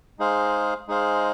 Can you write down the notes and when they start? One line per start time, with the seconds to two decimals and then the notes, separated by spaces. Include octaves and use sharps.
0.19 G#3 D#4 G#4 C5 F5
0.88 G#3 D#4 G#4 C5 F5